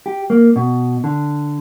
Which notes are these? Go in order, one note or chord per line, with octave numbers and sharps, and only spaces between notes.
G4
A#3
B2
D3